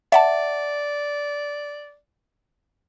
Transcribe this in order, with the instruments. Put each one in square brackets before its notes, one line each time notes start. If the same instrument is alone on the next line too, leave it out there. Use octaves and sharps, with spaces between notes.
[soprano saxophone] D5 [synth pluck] E5 F#5 A5